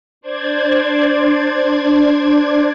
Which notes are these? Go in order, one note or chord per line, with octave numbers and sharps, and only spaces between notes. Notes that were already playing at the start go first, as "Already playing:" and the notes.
D4 C5 D5 G#6